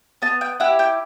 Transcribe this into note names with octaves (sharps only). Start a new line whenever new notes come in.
B3 A5
G5
E4 G4 F#5
G5